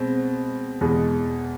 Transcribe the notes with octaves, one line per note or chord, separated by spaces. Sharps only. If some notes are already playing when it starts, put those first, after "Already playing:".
Already playing: B2 G#3 C4
E2 B2 G#3